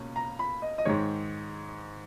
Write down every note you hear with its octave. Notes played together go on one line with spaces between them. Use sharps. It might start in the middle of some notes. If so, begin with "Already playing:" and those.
Already playing: C#2 B2 A#3 C#4
A#5
B5
D#5
D#5
G#2 D#3 G#3 C#5